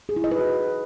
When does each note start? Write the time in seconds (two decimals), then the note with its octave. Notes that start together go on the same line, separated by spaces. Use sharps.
0.09 G#4
0.16 E4
0.24 D#5
0.31 B4
0.39 F#4